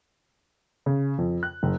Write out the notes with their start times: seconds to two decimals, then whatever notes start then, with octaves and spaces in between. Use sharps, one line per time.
0.86 C#3
1.18 F2
1.43 F#6
1.63 F#1